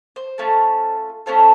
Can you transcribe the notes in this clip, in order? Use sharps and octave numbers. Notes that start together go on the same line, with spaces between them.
C5
A3 C#4 F4 A4
A3 C#4 F4 A4 C5